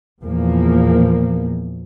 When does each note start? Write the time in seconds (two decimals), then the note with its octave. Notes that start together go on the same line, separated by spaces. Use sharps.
0.22 E2 A#2 F3 A#3